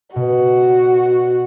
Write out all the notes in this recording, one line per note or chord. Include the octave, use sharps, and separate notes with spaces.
B2 F#4